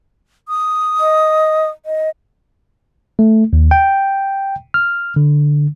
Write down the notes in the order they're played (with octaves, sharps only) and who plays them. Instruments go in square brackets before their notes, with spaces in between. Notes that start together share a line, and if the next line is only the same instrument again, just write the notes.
[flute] D#6
[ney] D#5
D#5
[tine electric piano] A3
D#2
G5
F6
D3